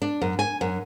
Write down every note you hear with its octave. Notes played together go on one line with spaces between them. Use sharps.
D4
F#2
G#5
F#2